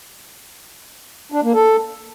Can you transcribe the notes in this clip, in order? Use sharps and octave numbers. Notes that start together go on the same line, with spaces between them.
D4
A#3
A4